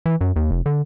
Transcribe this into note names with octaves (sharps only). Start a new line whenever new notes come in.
E3
F#2
D#2
F1
D3